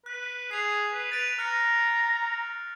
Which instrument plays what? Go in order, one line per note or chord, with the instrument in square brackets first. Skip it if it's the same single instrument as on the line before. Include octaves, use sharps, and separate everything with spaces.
[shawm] B4 [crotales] F#6
[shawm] G#4 [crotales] C7 F7
[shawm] B4
[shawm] B4 [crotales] A6 D7 F7
[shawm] A#5 [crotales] F6 F#6 C#7